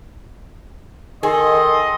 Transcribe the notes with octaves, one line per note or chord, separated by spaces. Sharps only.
D#3 G#4 A4 D#5 C6